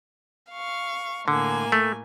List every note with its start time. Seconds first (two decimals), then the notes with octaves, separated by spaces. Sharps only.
0.51 F5 C#6
1.28 A2 D3 A#3 G#5
1.72 A3